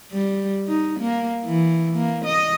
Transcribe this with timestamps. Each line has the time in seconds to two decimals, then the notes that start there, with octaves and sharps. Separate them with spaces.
0.12 G3
0.68 D#4
1.00 A#3
1.45 E3
1.96 A#3
2.25 D#5